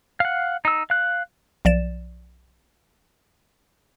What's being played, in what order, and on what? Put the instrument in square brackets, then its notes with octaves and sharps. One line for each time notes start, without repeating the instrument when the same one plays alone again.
[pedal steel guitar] F5 F#5
D#4 E6
F5 F#6
[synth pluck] B1 F3 D5 A6 E7